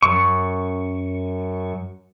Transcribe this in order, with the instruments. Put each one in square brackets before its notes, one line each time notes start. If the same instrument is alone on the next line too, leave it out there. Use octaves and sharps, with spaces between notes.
[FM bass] F#2 [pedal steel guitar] C#6